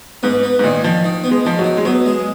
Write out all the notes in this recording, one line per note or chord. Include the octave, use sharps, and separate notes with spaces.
G#2 B3
B3
G#2
A#2 D#3
D#3 F3
D#3
B3
G#3
D#3 F3
F#3
D#3
G#3
F#3 B3
G#3